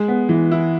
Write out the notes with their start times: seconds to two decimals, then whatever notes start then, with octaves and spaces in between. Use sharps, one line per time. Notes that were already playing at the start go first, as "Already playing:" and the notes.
Already playing: G#3
0.08 B3
0.29 E3
0.51 E4